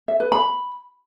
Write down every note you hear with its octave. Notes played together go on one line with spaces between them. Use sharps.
E5
B4
B5